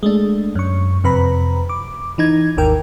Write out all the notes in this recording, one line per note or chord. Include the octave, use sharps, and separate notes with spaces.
G#3 A3 D4
F#2 C#6
F2 C3 B4 A#5 B5
D6
E3 D#4 G#6
G#1 D#2 D#3 A#4 G5